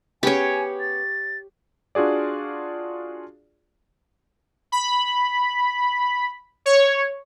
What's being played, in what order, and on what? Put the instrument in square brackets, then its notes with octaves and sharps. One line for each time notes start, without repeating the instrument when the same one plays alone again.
[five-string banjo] B3 C#4 G#4 [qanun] G4 C#5 [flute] G#5
[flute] A6
[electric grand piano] D4 F4 F#4 G#4 D5
[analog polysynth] B5
C#5